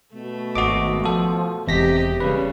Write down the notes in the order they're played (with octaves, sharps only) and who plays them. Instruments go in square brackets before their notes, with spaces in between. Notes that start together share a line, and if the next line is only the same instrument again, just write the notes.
[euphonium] B2 [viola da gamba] A3
[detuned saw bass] G#1 [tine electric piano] F#4 D#5 D6
[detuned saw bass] F3 [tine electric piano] F#4 A4
[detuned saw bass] E1 [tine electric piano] E2 A#6 B6 [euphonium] C3 [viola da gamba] G4 D#5
[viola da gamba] C#3 G3 [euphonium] C#4 [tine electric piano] B4